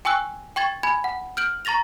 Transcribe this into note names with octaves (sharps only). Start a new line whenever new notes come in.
G5 G#5 C#6 E6 F#6
G5 C#6 G#6 A6
G#5 B5 G#6
F#5
F6 G6 D7 F#7
A#5 C#6 A6 A#6 F7